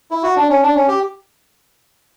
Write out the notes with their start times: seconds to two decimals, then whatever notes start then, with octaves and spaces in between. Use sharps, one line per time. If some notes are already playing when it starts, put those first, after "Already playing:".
0.11 E4
0.23 F#4
0.36 D4
0.49 C#4
0.63 D4
0.75 C#4
0.88 G4